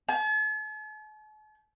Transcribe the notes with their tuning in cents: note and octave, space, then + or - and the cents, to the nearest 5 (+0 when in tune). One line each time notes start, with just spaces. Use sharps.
A5 -45